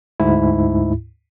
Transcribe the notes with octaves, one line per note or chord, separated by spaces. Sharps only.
D2 G#2 E4